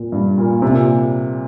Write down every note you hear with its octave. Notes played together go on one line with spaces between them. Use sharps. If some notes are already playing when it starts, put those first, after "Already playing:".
Already playing: A#2
G2
A#2
C3
A#2